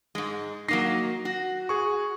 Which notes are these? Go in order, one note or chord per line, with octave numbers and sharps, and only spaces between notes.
G#2 G#3
F#3 A#3 D#4 A#6 C7
F#4
G#4 C#6